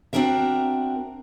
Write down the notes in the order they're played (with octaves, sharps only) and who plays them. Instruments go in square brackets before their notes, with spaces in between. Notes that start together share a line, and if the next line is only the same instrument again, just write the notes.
[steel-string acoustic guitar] C4 D4 F#4 A#4 E5